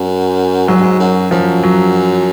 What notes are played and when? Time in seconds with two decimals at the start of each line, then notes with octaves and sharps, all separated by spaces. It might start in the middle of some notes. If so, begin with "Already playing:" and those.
Already playing: F#2
0.68 G#2 F#3
0.76 F#2
0.82 G#2
1.00 F#2
1.31 F#2 F3
1.63 F#3